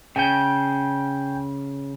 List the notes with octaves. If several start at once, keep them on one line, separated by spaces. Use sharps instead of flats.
C#3 G5 G#5 G6